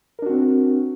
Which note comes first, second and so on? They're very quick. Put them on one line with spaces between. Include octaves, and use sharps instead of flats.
A#4 D4 F#4 C4